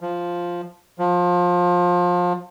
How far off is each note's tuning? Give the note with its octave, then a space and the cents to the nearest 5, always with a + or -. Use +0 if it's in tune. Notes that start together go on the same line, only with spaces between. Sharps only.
F3 +0
F3 +25